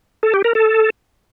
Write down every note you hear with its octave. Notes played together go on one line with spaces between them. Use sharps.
A4
G4
A#4
A4